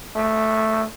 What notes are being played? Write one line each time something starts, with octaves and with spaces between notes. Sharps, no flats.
A3